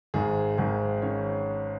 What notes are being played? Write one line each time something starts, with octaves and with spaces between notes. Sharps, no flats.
G#1 G#2 D#3 G#4
G#1 G#2 D#3 G#4
D#3 C#4 C#5